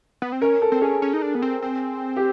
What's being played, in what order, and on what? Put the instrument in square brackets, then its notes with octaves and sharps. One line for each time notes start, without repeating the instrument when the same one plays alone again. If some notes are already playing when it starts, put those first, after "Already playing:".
[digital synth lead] B3
C4
[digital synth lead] C#4 [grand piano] A#4
[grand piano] A4
[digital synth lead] C4
[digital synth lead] C#4 [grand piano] G#4
[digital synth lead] C#4
D#4
D4
B3
C4
C4
[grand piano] G4